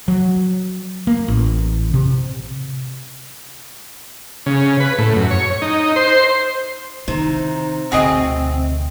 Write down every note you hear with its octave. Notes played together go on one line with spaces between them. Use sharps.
F#3
A#3
A1
C3
C#3
B4
A2
F#2
C#5
D#4
C5
C3 D#3 D#4
D2 B2 C4 F#4 G#4 D#5